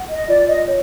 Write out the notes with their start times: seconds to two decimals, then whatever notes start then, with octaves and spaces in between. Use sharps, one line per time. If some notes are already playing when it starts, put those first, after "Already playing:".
Already playing: F#5
0.09 D#5
0.28 F4 D5
0.48 D#5
0.68 C#5